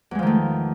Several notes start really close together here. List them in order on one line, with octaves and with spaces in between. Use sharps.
E2 G#3 F3 D#3 A3